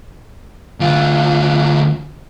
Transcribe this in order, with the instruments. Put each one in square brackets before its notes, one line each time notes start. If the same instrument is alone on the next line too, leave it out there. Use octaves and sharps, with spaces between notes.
[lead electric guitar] D2 F4